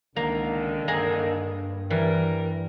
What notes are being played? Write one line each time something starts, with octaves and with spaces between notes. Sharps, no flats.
C#2 D3 D#3 A#3
G2 A#3 G#4 D#5
E3 G3 A#4